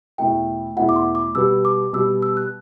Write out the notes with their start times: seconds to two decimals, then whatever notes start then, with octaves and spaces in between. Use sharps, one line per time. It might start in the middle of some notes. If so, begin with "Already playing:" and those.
0.18 E2 B2 A3 E4 G5
0.77 E2 B2 A3 E4 F#5
0.89 D6
0.96 C6
1.15 D6
1.35 B2 G3 B3 E6
1.65 D6
1.93 B2 G3 B3 E6
2.22 E6
2.37 F#6